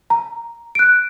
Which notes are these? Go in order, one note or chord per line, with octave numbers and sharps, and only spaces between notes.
A#5
F#6 D7